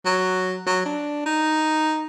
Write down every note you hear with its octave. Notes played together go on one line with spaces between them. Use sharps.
F#3
F#3
D4
D#4